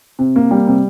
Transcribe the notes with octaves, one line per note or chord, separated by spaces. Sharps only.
C3
A#3
G3
C3